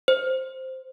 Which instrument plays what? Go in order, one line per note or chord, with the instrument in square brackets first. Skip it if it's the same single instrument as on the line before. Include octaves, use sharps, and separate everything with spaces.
[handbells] C5